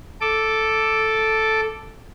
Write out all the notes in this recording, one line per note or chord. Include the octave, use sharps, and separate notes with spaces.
A4 D6